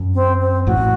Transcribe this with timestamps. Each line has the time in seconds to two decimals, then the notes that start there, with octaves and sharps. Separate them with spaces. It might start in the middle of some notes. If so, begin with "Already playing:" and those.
Already playing: F#2
0.14 C4
0.40 C4
0.67 A1 A2 F#4
0.78 A2